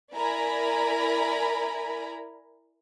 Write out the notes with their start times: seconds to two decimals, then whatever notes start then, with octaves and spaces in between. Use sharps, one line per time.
0.15 E4 A#4 D5 G#5 A#5 B5